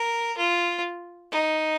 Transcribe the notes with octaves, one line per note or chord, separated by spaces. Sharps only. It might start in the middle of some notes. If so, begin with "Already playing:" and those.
Already playing: A#4
F4
D#4